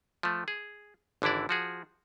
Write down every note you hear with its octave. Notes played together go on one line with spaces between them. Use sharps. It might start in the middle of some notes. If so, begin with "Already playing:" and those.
F3 A3
G#4
G#1 D3 E3 E4 D5
F3 F#4 G#4